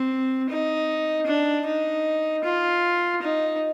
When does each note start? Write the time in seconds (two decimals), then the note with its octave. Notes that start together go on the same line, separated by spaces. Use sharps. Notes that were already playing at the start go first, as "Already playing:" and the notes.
Already playing: C4
0.49 D#4
1.27 D4
1.66 D#4
2.44 F4
3.22 D#4